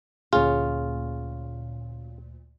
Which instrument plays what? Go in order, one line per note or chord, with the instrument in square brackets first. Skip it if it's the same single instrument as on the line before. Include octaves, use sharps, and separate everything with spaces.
[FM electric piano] D2 A#2 [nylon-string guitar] C#4 G#4 [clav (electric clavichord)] F4